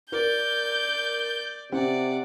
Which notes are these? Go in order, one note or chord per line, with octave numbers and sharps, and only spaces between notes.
A#4 D5 G6
C3 C4 D5 F#5